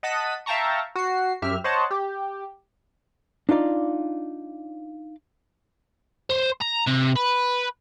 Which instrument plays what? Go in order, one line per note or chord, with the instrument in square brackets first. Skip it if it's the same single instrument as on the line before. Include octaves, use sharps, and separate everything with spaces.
[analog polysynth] D#5 F#5 A5 B6 D#7
E5 F5 G5 A5 A#5 C#6
F#4 C7
F#2 G4 E5 F6
C5 C#5 D#5 F#5 A5
G4
[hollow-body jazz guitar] D4 D#4 F4 D5
[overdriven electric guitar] C5
A#5
C3
B4